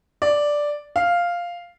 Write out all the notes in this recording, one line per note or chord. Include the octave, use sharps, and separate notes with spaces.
D5
F5